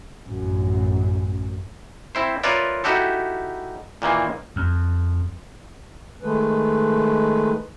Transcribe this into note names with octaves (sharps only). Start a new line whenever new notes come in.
A1 F#2
C4 E4 C5
F4 A#4 B4 C#5 D5 E5
D#4 E4 F#4 G4 A4
A#2 D#3 E3 A#3
F2
D#3 G#3 A3 B4